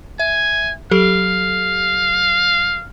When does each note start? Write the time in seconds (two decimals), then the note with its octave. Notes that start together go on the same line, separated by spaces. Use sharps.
0.19 E5 G#5
0.91 F#3 G4 A4 F5